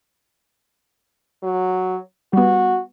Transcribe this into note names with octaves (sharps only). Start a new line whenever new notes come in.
F#3
G3 B3 F#4